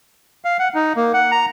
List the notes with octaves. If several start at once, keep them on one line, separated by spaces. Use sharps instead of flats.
F5
F#5
D#4
A#3
F#5
A#5